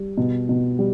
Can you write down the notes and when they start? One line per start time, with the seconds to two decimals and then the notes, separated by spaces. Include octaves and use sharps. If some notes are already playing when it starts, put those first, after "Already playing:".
Already playing: G3
0.17 B2
0.49 B2
0.79 G3